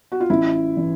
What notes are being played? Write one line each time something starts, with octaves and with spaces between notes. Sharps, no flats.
F#4
F4
A1 E4
E3